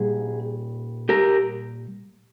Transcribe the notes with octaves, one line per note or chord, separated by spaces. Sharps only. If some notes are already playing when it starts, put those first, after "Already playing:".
Already playing: A#2 G3 G#4
G4 A#4